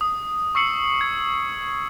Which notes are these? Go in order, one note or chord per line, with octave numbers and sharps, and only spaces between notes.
D#6
C#6 E6 C7 C#7 F#7
G#6